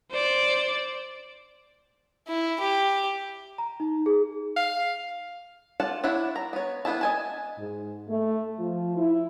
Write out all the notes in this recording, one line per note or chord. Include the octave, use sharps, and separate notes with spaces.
C5 D5
E4
G4
A#5
D#4
G#4
F5
F4 D5 F#5 A5
D4 E4 C#5 F#5
A#5
B3 C#5
B3 D4 E4 A5
D#5 G#5 A5
G#2
A3
F3
E4